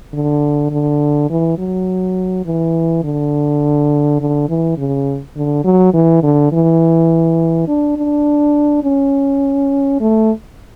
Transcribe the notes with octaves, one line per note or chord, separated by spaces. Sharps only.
D3
D3
E3
F#3
E3
D3
D3
E3
C#3
D3
F#3
E3
D3
E3
D4
D4
C#4
A3